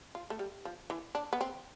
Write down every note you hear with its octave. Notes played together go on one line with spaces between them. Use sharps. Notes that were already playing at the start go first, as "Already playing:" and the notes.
F4
A3
G3
F3
E3
D4
B3
C4